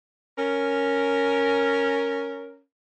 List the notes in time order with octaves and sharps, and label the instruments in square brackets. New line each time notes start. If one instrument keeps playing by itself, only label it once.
[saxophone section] C#4 A#4